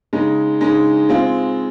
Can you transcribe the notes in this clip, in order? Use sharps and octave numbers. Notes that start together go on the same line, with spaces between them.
C#3 G#3 D#4
C#3 G#3 D#4
G#3 C4 F4